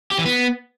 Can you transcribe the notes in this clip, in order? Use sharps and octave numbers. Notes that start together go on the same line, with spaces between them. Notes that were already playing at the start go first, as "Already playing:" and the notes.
G4
E3
B3